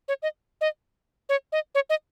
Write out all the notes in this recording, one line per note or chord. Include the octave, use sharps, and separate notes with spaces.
C#5
D#5
D#5
C#5
D#5
C#5
D#5